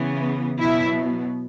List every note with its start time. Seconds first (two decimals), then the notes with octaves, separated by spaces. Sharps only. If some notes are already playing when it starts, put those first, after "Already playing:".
Already playing: C#3 E3 B3
0.59 B2 F#3 B3 E4 E5